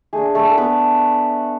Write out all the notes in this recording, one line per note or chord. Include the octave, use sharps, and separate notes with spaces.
A3 D4 G#4
A3 A4
A4
B3 B4